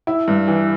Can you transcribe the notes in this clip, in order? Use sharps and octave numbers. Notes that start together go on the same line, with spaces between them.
E4
G2
E3